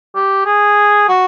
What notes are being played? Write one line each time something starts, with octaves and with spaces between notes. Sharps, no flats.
G4
G#4
F#4